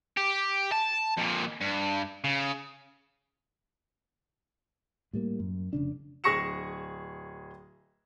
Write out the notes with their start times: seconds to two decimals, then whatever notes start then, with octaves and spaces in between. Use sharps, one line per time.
0.17 G4
0.72 A5
1.18 F2 A#2
1.61 G2
2.24 C#3
5.13 A2 G3 A#3
5.40 F#2
5.73 F1 C#3 D4
6.24 D1 G#4 C#6 A#6 C#7 E7